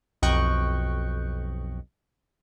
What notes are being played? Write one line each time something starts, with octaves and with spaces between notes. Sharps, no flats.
B1 F2 D#5 G5 C#6 F#6